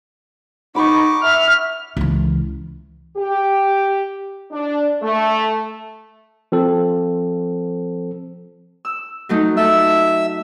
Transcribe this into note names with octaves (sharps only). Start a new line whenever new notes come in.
D#4 F#5 B5 C#6 D6
E5 F6
C#2 E3
G4
D4
A3
F3 C4 A4
E6
F#3 A3 D#4
A3 A4 E5 E6